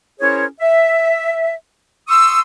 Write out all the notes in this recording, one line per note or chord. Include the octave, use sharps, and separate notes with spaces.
C#4 E4 G#4 A#4 C5 C#5
E5
C6 C#6 D#6 E6